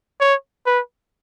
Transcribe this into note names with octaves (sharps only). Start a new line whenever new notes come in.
C#5
B4